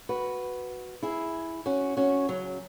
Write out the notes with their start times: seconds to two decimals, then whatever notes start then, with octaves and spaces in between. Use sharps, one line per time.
0.09 F#4 B4
1.03 E4 G#4
1.66 C#4 F#4
1.97 C#4 F#4
2.29 C#3 F#3